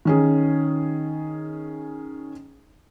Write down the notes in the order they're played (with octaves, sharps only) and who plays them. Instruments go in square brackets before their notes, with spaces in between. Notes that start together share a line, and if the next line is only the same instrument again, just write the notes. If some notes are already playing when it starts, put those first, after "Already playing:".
[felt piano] D#3 C#4 G#4